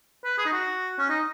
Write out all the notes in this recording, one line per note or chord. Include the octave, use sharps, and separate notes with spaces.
B4
G#4
D#4
F#4
C#4
D#4